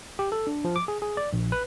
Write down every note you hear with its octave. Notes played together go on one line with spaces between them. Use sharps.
G4
A4
D4
F3
D6
G#4
G#4
D5
A#1
B4